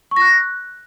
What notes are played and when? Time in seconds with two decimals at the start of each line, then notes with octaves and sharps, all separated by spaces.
0.11 C#6
0.16 A#6
0.21 F#6